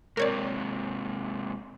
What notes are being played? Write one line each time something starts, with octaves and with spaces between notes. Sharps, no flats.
G#2 C3 A#4 C#5 D5